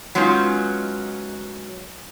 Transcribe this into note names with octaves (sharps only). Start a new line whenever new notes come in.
F#3 G#3 B3 C#4 D#4 F4